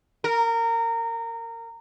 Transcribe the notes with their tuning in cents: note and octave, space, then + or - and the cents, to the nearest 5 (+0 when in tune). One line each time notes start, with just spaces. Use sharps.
A#4 -20